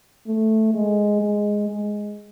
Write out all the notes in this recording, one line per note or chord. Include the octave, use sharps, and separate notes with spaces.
A3
G#3
G#3
G#3